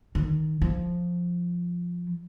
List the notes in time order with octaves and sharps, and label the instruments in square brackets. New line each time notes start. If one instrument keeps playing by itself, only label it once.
[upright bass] D#3
F3